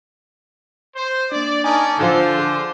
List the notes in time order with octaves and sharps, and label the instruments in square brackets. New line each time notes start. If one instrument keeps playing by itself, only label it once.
[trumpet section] C5
[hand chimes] A#3 D4 [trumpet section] D5
[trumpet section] C#4 A#4 D5 [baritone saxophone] D#4 [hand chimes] G#5 A5
[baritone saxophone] D3 [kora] F3 A4 G5 [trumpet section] F4 C5
[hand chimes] G#4 D6